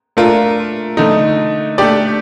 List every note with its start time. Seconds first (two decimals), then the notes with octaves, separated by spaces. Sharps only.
0.17 A3 D4 F4 A#4
0.97 D3 A3 D#4
1.78 A3 D4 G4 D5